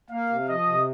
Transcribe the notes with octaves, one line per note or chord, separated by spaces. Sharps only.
A#3 F5
C3
F3 D#5
C3